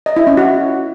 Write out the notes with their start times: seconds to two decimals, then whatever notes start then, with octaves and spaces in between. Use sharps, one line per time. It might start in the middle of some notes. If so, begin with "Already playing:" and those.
0.06 D#5
0.17 E4
0.27 C#4
0.37 F#4